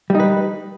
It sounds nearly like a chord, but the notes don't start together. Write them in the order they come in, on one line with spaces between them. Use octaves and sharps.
G3 D#4 B4